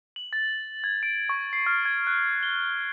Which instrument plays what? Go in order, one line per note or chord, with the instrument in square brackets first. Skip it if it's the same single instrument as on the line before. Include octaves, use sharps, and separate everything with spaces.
[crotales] F#7
A6
G#6
D7
C#6
C7
F6
G#6
F#6
G7